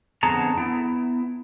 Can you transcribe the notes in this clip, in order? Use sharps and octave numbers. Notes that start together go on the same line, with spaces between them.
F2 D3 B3 G#4 A5 A#5
B3 E4